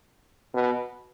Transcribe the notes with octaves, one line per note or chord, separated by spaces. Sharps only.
B2